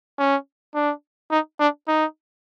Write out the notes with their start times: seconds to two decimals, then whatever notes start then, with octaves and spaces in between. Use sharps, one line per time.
0.19 C#4
0.74 D4
1.31 D#4
1.60 D4
1.88 D#4